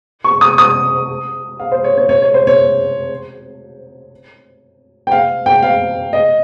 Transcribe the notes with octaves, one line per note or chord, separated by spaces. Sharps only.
C#6
D#6
D#6
F5
C5
C#5
C#5
C#5
C#5
C5
C#5
G5
F5
G5
F5
D#5